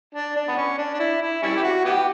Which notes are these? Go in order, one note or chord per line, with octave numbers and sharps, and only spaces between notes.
D4
D4
B3
C#4
D4
D4
E4
E4
G3 C#4 E4
G4
F#4
B3 E4 G4